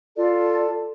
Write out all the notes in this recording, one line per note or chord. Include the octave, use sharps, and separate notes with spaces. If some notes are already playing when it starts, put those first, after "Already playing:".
F4 A4 D5